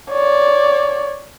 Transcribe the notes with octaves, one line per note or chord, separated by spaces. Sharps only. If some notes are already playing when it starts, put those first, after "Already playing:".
C#5 D5